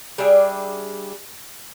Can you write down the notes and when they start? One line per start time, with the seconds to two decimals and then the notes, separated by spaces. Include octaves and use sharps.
0.18 G3 D4 G#4 E5